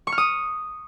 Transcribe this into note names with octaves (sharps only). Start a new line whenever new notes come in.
C#6
F6
D#6